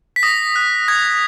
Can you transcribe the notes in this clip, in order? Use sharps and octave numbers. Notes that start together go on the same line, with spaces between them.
B6
D#6 A#6
F#6
D#6 G#6